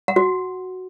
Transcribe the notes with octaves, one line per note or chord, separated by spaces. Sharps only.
F#5
F#4